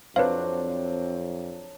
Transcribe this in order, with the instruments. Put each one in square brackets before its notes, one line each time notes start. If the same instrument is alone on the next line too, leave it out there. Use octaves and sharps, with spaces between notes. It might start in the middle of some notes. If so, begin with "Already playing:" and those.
[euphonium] F2 [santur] F#3 D4 [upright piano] C4 [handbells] B4 C#5 F5